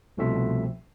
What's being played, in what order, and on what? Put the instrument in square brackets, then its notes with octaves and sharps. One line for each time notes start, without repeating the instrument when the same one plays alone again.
[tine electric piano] C2 B2 F3 A3 C4 E5